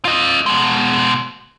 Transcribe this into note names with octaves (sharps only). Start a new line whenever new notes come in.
F4 D#5
B2 G#3